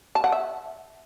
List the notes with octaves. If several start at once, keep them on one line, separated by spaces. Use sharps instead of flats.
A5
F#5
E5